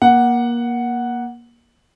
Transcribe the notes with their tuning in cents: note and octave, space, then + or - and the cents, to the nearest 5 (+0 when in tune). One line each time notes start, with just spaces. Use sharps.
A#3 +25 F#5 +0